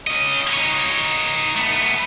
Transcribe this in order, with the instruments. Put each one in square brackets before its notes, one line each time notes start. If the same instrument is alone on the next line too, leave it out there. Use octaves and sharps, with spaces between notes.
[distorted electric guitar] C#4 D#5
D#4 C#5
A3 B3